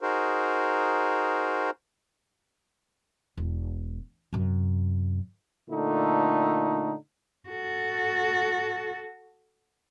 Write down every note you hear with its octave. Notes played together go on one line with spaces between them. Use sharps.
D#4 F#4 G#4 A#4 C5
E1
F#2 C3
A#2 D3 A3 D#4
F#4 A4